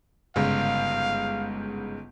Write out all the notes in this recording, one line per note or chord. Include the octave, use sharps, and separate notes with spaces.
G1 G#2 C#3 F5